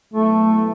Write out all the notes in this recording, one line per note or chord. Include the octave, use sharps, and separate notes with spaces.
B2 F#3 A3 B3 E4